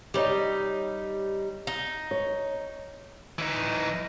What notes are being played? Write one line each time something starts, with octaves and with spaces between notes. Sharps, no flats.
G3 D#4 G4 C#5 D#5
D#4
C#5
E3 D#4